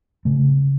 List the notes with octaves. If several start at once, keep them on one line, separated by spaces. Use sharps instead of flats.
C#3 A3